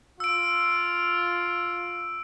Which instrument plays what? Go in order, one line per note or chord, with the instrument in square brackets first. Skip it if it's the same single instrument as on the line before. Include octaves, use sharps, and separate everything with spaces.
[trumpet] F4 [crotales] E6 D7